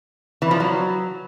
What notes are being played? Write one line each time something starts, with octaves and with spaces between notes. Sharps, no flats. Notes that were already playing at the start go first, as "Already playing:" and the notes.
E3
F3
F#3